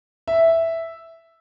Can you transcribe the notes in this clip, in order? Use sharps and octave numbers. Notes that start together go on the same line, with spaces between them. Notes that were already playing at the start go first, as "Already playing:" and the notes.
E5